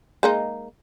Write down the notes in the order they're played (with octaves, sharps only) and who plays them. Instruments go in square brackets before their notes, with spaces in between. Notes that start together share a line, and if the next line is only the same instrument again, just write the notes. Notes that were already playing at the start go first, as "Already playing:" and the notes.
[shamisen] G#3 A#3 D#4